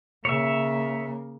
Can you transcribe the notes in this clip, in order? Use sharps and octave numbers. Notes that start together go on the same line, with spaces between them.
C#3 A#3 C#5 E5